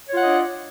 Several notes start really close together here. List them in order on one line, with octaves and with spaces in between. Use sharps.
C#5 F4 F#5 D#5 D4